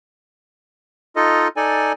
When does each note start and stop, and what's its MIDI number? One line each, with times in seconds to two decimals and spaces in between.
1.16 1.48 63
1.16 1.48 65
1.16 1.48 69
1.16 1.48 75
1.57 1.93 63
1.57 1.93 69
1.57 1.93 74
1.57 1.93 80